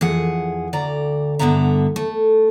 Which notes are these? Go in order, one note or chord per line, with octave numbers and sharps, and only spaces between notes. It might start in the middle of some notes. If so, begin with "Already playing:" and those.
F2 E3 G#4 F#5
D2 D5 A#5
G2 D3 A3 B3 E5 A#5
A3